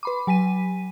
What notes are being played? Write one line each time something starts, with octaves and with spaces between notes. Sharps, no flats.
B4 B5 D6
F#3 G#5 B6 D#7